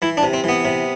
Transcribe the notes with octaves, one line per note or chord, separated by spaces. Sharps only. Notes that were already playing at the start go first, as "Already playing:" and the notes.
E3 E4
D4
C3
C4
E3 B3
C3